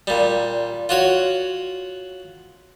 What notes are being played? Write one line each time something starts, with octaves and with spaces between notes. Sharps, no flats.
A#2 G3
F4 F#4 C#5